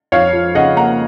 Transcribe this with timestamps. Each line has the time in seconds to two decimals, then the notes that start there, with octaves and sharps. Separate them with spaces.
0.12 F2 C#5 F5
0.33 F3
0.55 C#3 D#5 F#5
0.76 A#3 F#5 A#5